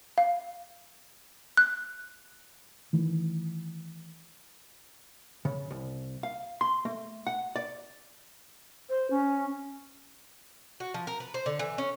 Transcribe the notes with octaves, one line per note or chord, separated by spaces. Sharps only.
F5
F#6
D#3 E3 A3
C#3
C2
F5
C6
A3
F#5
D5
C5
C#4
F#4
F3
A#4
B4
C5
D3
E3
C#4